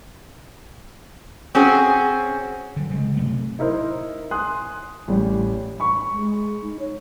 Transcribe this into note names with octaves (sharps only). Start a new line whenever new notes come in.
C4 C#4 F#4 G#4
D3 F#3
C#3 G#3
C3 F#3 A3
D#4 E4 A#4 C5
G#5 C6 D#6 F#6
A1 G3
B5 C#6
G#3
D#4
C#5